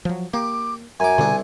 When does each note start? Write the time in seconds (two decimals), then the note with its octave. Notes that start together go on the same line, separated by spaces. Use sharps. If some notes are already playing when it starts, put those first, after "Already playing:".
0.05 F3 F#3
0.33 A#3 G4 D6
1.00 F#2 G#5 A#5 D6
1.18 C2 B2 D3 D4